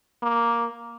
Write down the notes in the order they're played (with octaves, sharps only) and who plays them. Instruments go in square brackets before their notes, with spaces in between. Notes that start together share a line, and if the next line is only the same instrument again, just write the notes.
[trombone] A#3